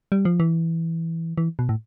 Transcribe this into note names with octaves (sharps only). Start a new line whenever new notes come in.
G3
F3
E3
E3
B2
A2